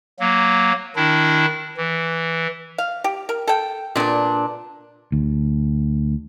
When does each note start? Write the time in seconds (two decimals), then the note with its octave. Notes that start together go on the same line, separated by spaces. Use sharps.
0.20 F#3 A#3
0.96 D#3 D4 E4
1.77 E3
2.78 F5
3.04 G4
3.29 A#4
3.47 A4 G5
3.96 A#2 D3 B3 D4
5.12 D2